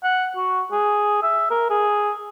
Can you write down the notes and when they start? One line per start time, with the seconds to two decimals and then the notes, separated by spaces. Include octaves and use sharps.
0.04 F#5
0.36 F#4
0.72 G#4
1.23 E5
1.50 A#4
1.70 G#4